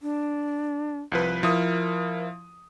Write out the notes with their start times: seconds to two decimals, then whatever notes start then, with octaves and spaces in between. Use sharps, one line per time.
0.02 D4
1.12 C2 F3 B4
1.43 F3 E4 A#4 D#6